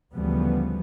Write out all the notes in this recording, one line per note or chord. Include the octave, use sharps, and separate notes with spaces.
D2 C#3 E3 F3 G3 B3